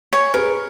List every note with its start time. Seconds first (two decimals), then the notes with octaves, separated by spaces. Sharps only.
0.13 C#5 G#5
0.34 G#4 A#4 B4